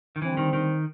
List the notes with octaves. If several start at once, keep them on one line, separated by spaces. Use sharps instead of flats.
D#3
D3 E3 G3 C4
D#3
D#3